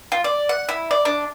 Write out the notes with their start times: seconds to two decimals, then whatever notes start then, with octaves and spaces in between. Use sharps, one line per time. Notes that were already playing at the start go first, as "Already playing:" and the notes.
0.12 F4
0.24 D5
0.49 F#5
0.69 E4
0.91 D5
1.05 D4